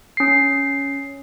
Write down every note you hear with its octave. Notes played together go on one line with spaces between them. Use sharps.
C#4 C7